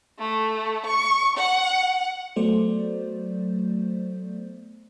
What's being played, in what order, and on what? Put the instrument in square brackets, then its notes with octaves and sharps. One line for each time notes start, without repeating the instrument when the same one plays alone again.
[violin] A3
C#6
F#5
[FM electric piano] F#3 A3 B3 C5 D5